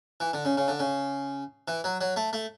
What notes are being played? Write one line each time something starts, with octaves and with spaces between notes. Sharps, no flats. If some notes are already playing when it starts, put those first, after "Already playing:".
E3
D3
C#3
C#3
D3
C#3
E3
F#3
F#3
A3
A3